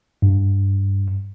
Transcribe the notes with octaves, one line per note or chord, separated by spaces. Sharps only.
G2